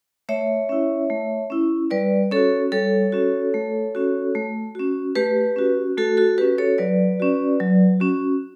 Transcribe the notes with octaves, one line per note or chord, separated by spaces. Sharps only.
A3 C#5 E5
C#4 E4
A3
C#4 E4
G3 B4 D5
C#4 F#4 A4 C#5
G3 A4 C#5
C#4 F#4
A3
C#4 F#4
A3
C#4 F#4
A3 G4 B4
C#4 F#4
A3 F#4 A4
F#4 A4
C#4 F#4 G4 B4
A4 C#5
F#3 B4 D5
C#4 F#4
F#3
C#4 F#4